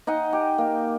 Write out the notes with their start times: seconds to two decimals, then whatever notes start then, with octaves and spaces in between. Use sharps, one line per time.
0.07 D#4 D#5 F#5 G#5
0.33 G4
0.58 A#3